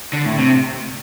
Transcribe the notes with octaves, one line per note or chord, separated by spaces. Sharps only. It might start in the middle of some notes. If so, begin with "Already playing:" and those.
D3
A2
C3